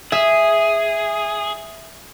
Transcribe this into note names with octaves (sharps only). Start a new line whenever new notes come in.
G#4 E5